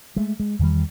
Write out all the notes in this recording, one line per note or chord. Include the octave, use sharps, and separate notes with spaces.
G#3 A3
G#3
E2 D#3 G3